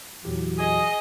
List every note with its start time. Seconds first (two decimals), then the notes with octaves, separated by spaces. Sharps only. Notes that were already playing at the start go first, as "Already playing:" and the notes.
0.25 E2 A#2 E3 F#3 G4
0.59 G#4 D#5